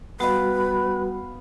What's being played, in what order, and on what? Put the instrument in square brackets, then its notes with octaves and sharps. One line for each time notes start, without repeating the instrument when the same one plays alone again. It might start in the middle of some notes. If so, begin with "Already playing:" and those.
[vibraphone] G3 F#4 [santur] B3 F5 [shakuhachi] B4 [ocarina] B5